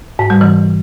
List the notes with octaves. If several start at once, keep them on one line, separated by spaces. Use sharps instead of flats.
G#2
G3
E3